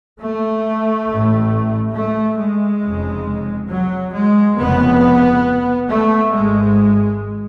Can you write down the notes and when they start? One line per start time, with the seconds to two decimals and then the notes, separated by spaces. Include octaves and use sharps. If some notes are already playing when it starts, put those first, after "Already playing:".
0.19 A3
1.07 A1 A2
1.94 A3
2.38 G#3
2.82 F1 F2 C#3
3.69 F#3
4.13 G#3
4.57 F1 F2 C#3 B3
5.88 A3
6.32 G#1 G#2 G#3